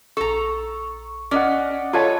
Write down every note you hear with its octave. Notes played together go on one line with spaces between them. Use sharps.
A#1 A4 A#5 C#6
C#4 D5 D#5 F#5
F4 A4 C#5 D#5 G#5 B5